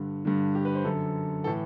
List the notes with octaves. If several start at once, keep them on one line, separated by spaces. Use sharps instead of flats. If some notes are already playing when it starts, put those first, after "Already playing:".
Already playing: G2 D3
G2 D3
G4
B4
C5
F#2 D3 A4
A2 E3 A4